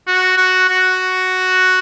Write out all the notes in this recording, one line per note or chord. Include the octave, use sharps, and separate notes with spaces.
F#4
F#4
F#4